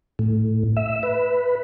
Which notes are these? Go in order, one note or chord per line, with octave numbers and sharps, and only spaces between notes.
A2
E5
B4